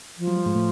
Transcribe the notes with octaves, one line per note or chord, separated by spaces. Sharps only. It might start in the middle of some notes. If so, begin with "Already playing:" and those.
F3
F#3
G3
G#2 G#3
A2 A3